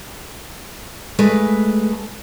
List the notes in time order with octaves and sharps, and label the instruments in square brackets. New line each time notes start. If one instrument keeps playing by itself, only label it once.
[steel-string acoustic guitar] G#3 A3 B4